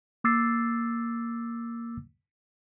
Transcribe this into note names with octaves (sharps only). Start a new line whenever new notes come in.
A#3 D6 E6 A6 C7